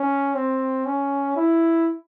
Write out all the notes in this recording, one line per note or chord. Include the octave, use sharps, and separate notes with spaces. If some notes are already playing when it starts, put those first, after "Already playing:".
Already playing: C#4
C4
C#4
E4